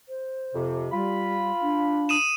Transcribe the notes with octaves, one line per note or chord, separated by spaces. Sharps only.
C5
F2 C3
G3 F4 B5
D4
D#6 D#7 E7